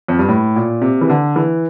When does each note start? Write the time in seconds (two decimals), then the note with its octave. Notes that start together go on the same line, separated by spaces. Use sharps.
0.08 F2
0.19 G2
0.29 A2
0.56 A#2
0.82 C3
1.01 E3
1.10 D3
1.36 E3